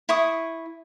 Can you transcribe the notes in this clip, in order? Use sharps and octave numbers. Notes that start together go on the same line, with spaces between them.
E4 C#6 D#6